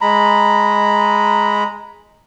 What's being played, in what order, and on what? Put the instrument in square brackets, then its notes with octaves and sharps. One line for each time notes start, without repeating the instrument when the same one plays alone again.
[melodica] G#3 A#5 B5